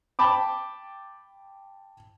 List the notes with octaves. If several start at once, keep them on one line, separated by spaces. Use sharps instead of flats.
G5 A5 B5 D6